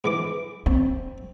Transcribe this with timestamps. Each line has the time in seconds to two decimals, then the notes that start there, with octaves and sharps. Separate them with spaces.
0.04 G#2 E3 D6
0.66 C4